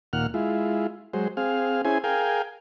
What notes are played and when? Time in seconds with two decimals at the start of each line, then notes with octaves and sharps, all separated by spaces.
0.13 D#2 A#2 F#5 F6
0.34 G#3 E4 F4
1.13 F#3 G#3 C5
1.37 C4 G#4 F5
1.85 C#4 E4 G#4 C5 G#5
2.04 G#4 A#4 F5 G5 G#5